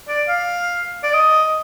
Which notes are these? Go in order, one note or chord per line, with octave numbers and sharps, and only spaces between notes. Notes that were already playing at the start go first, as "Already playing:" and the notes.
D5
F5
D5
D#5